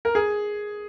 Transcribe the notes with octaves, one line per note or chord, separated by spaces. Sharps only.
A#4
G#4